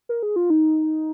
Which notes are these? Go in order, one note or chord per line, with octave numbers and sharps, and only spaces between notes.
A#4
G#4
F4
D#4